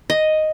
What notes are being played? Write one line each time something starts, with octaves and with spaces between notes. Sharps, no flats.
D#5